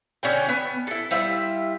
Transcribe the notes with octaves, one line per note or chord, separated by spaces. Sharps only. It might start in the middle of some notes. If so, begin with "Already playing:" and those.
D3 C#4 F#4 G5
B3
E4 A4
G3 E4 F4 E5